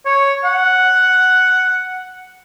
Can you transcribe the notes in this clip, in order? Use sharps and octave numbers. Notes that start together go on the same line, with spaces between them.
C#5
F#5